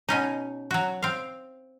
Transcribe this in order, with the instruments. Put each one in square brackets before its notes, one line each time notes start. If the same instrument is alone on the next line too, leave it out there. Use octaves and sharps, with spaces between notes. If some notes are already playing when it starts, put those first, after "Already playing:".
[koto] B2 C#4 D#4
F#3 F#4
C4 F5